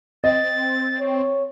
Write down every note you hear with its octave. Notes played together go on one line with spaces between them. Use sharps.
C4 D#5 A6
C#5